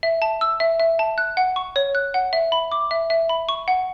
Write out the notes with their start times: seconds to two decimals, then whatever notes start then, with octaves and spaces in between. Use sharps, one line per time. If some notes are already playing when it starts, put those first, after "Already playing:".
0.03 E5
0.22 A5
0.41 E6
0.60 E5
0.80 E5
0.99 A5
1.18 F#6
1.37 F#5
1.56 C#6
1.76 C#5
1.95 F#6
2.14 F#5
2.33 E5
2.52 B5
2.72 D6
2.91 E5
3.10 E5
3.29 B5
3.49 C#6
3.68 F#5